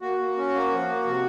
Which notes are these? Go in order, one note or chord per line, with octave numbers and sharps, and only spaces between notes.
A#3 F#4
A#3
C#4
A#3
F3
A#3
C3